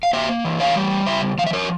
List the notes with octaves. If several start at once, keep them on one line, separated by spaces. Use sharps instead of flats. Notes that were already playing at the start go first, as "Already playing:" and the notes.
F5
A#3 C5 E5
E3
C#5 F5
G3
C#3 C5 E5
F3 F5
E5
A#4 C#5